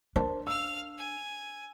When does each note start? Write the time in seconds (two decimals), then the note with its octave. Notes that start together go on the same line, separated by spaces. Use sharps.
0.16 D4 A#4 C5 A5
0.47 F5 E6 F6
0.98 G#5